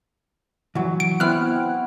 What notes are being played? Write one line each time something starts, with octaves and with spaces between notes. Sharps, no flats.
E3 F#3 F#4
D7
B3 C4 E4 F6 F#6